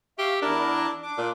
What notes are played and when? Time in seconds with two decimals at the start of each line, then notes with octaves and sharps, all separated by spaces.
0.18 G4 E5 F5 C#6
0.42 E2 D4 E4 A#4
1.03 D4 D6
1.18 A#2